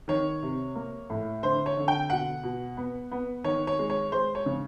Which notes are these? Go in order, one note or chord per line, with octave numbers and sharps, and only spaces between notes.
D#3 C#5
C3
A#3
A2
D3 C5
C#5
D3
G5
B2 F#5
B2
B3
B3
D#3 C#5
C#5
G#3
C#5
G#3 C5
C#5
C#3